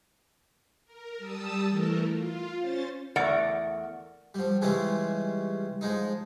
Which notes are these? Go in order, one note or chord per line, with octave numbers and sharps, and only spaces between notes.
A#4
G3 A5 D#6 E6
E3 A3 A4 A#4
F4
C#4 C5 A6
E2 A3 A#4 D5 F#5
F3 G3
C#3 E3 G3 G#3 C#4 F4
F3 G#3 D#4